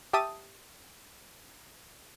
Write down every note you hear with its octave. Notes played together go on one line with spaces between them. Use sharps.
G4 E5 A5 D#6